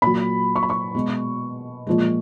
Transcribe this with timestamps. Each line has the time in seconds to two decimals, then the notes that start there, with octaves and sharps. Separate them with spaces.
0.02 A#2 F#3 B5
0.56 C#6
0.63 B5
0.70 C#6
0.95 B2 G#3
1.87 A#2 F3 G#3